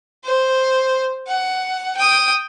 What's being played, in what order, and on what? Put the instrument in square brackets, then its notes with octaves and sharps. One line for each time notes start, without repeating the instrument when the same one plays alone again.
[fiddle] C5
F#5
G5 D#6